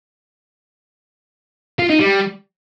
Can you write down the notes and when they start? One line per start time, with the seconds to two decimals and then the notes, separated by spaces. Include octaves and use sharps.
1.79 F4
1.90 D#4
2.00 G3